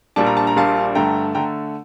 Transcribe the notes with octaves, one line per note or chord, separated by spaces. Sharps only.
A#1 A#2 G3 D4 A5
A#5
A5
A#5
A#1 A#2 G3 D4 F5 A5
G2 D3 A3 G5 A#5
D3 A3 G5 A#5